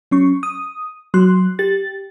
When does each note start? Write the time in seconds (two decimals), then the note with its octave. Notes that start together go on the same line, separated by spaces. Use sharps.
0.11 F#3 C#4 C#6
0.43 D#6
1.14 F#3 C6 F#6
1.59 G4 A6